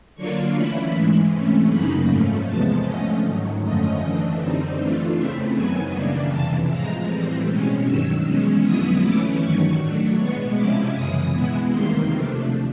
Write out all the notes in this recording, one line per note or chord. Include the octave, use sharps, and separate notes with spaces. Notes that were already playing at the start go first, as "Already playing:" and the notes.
D3 F#3 A#3 D4 F4 C#6
E3 A3 C#4 E4 B5
G#2 E3 G#3
C3 E3 A3 C#4
F#2 C#3 F#3 A#3 D#4 B5
G#2 F3 A3 C#4
E2 C3 F3 G#3 B3 A5
D3 F3 A3 C#4 D#5
G#2 D#3 F#3
F#2 D3 F3 A3 C#4 D#5
E3 A3 D4
F#2 D3 G3 C4 D#4
E3 A3 D4 F4
E2 C#3 E3 A3 C4 E5
F#2 D#3 F#3 B3 G#5
C#3 E3 G3 A#3 D4
F2 C3 E3 A5
A2 F3 G#3 A#5
A2 E3 G3 C4
B2 G#3 C#4
G2 D#3 F#3 E6
E2 B2 G#3 C#4
F2 D3 F#3 B3 E4 D#6
E3 A3 C#4 E4 D6
G2 D#3 F#3 C#6
A2 F#3 A3 D4
B2 G#3 B3 C#6
C3 F3 G#3 C#4 E4 D6
F#2 C#3 E3 D#6
B2 G#3 B3 E4
E2 C3 D#3 G3 A#3 C6
C3 F3 A3 D4